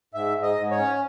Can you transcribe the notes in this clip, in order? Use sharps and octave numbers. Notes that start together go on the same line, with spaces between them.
G#2 E5
G#2
D#5
G#2
C#5
C#4